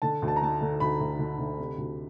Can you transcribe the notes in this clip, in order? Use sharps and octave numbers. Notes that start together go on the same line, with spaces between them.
D3 A5
D2
A5
A#5
D3 A5
D3
D2 B5
D2
D3
D3
C3
D2